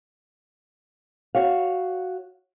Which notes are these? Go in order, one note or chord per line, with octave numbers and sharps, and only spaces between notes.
F#4 C#5 F5